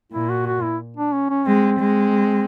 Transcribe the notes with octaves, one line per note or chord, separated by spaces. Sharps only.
A#2 E4
F#4
F#4
E4
D4
C#4
C#4
G#3 C4
G#3